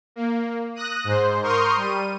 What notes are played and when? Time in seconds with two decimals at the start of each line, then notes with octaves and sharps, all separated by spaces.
0.16 A#3
0.75 D#6 F#6 A#6
1.04 G#2 C5
1.42 A#4 C6 C#6 D#6 F6 G6
1.76 G3 D#7